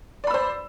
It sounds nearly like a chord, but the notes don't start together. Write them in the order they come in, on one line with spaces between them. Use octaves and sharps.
D5 B5 E6 C5